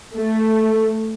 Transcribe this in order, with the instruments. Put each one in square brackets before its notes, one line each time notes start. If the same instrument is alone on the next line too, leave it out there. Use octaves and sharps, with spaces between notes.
[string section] A3